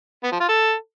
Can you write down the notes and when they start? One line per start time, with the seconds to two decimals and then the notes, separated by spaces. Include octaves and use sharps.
0.24 B3
0.32 F3
0.41 F4
0.49 A4